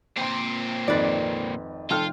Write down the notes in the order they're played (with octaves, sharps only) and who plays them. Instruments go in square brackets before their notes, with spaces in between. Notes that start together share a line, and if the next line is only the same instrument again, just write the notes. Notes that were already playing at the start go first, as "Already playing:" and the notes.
[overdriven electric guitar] A#2 C4 [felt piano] G5 C6
[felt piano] G#1 F2 A6 [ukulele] B4 D5
[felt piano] F1 G5 F6 [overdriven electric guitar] F4 [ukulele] A4